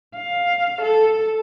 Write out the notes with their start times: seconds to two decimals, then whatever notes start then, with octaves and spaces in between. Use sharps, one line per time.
0.16 F5
0.82 A4